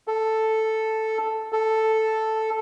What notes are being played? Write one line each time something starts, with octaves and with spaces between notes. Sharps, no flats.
A4
A4